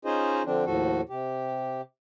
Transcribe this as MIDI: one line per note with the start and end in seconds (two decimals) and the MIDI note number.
0.05 0.42 61
0.05 0.42 63
0.05 0.42 65
0.05 0.42 68
0.05 0.42 72
0.05 0.42 75
0.45 0.65 50
0.45 0.65 53
0.45 0.65 60
0.45 0.65 62
0.66 1.01 39
0.66 1.01 45
0.66 1.01 53
0.66 1.01 66
0.66 1.01 69
1.09 1.81 48
1.09 1.81 67